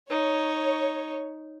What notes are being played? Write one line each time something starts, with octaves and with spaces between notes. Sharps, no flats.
D#4 C#5